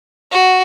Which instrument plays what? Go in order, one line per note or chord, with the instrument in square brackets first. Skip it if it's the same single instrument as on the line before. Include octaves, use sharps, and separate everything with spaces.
[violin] F#4